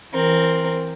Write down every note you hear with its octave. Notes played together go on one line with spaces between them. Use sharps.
E3 C4 A#4